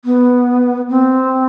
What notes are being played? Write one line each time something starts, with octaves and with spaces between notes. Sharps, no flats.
B3
C4